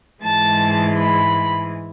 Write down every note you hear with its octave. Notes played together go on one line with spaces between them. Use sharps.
G#2 E3 G#3 A5
B5